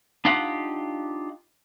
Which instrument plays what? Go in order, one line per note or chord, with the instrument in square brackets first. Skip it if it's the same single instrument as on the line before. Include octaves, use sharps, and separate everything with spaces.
[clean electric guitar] D4 D#4 F4 G4 F5 F#5